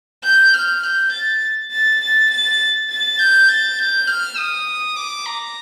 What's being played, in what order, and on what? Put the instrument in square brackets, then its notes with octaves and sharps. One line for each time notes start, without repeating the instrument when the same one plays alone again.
[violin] G6
F6
G6
A6
A6
A6
A6
A6
G6
A6
G6
F6
D#6
D6
A#5